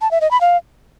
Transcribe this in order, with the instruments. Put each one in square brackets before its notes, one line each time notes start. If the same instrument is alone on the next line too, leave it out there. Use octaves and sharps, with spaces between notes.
[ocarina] A5
E5
D#5
B5
F5